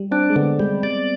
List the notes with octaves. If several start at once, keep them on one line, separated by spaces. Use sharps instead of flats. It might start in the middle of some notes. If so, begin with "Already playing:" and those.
Already playing: G3
C4 D4
G#3
D3 B3
G3 G#3
D5